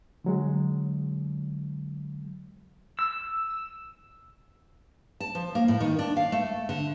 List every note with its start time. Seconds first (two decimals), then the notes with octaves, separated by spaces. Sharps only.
0.24 D3 F#3 G#3
2.99 E6
5.20 A5
5.35 F3
5.55 A#3
5.68 A2
5.80 D#3
5.99 D4
6.17 F5
6.32 A3
6.69 D3